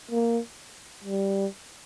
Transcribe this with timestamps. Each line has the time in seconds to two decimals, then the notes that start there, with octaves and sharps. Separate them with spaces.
0.11 A#3
1.04 G3